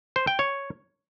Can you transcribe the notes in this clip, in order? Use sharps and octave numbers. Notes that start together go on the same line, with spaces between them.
C5
G5
C#5